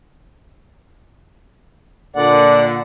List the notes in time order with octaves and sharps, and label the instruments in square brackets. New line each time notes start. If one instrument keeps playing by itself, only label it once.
[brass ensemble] A#2 D3 [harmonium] D5 F#5